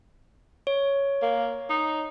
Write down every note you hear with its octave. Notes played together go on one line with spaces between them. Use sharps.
C#5
A#3
D#4